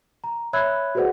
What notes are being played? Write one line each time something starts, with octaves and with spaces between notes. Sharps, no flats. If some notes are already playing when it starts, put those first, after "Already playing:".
A#5
C#5 E5 B5 E6 F#6 G#6
F#4 G#4 B4 C5 D5 F#5